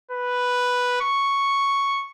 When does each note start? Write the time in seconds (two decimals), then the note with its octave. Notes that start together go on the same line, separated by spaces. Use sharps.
0.11 B4
1.01 C#6